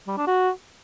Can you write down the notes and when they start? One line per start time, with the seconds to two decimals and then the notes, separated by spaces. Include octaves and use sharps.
0.08 G3
0.18 D4
0.27 F#4